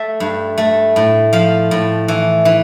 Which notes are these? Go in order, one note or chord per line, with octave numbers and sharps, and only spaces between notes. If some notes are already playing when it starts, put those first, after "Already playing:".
Already playing: A3 E5
G2
A3
A2
F3 F5
A2
E3
E3